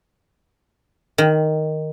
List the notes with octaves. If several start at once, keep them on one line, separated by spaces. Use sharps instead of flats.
D#3